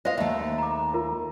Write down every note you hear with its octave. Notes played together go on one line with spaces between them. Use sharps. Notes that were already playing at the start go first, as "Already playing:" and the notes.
F#4 C5 D#5 F5
D#2 A3 E5
A#5 D6
F4 A#4